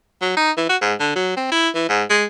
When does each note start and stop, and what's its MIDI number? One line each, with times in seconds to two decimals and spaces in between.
0.21 0.33 54
0.37 0.52 63
0.57 0.66 52
0.69 0.77 66
0.81 0.94 44
1.00 1.14 50
1.16 1.37 54
1.37 1.47 60
1.52 1.69 64
1.75 1.85 52
1.89 2.04 44
2.10 2.25 56